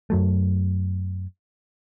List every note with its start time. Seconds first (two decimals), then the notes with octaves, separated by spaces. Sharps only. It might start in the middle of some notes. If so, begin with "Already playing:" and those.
0.10 F#2 F#3 A3